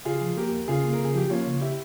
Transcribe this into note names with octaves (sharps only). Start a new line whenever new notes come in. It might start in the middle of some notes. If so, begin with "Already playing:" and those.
C#3 F4 G#4
F3
A#3 G4 A#4
E2
C#3 F4 G#4
A#3
A#4
C#3 G#4
F3 G4
A#3 C#4 F4
C#3
E4 G4